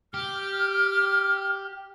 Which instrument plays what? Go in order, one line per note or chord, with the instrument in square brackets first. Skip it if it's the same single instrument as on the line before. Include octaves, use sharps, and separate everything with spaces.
[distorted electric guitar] G4 [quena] F6